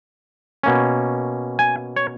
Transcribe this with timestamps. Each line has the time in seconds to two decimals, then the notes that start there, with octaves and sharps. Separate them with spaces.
0.63 B2 A#3 C#4
1.59 G#5
1.96 C#5